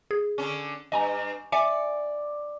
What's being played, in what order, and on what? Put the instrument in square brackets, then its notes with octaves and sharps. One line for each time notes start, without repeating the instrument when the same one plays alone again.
[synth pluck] G#4
[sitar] D3 C#4
[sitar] G2 [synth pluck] D#5 G#5 A#5
[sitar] D5 [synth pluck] E5 G#5 C#7